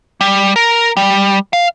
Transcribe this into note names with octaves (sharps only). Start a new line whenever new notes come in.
G3
A#4
G3
F5